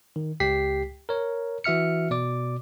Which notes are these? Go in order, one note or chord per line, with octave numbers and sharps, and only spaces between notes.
D#3
C#2 G4 G5 B6 C7
A#4 C#5
E3 F#4 E5 F6 C#7
B2 D5 D6